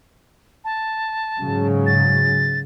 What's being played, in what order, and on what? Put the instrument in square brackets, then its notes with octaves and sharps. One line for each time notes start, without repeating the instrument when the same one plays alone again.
[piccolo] A5
[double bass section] G#2 C#3 F#3
[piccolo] A6